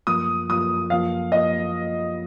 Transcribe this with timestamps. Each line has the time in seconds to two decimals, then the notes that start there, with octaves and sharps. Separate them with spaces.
0.07 F#2 F3 A#3 F4 D#6
0.50 F#2 F3 A#3 F4 D#6
0.90 F#2 F3 A#3 F4 F5
1.32 F#2 F3 A#3 F4 D#5